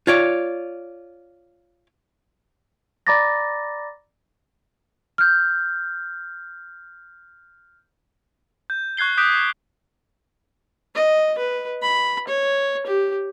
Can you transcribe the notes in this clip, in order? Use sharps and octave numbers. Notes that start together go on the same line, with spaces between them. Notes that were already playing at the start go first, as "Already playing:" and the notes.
F4 C#5 D5
D5 A#5 B5 D6 A6 A#6
F6 G6
G6
C#6 F#6 G#6 C7 G7
D6 D#6 F#6 G6 B6 D7
D#5
B4
B5
C#5
G4